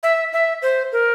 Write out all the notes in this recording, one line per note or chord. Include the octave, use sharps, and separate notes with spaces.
E5
E5
C5
A#4